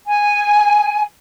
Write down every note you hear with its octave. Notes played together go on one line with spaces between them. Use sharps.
G#5